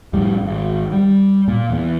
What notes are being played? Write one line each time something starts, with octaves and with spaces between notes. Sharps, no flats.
F2 A2 G3
G#1
G3
A#2
E2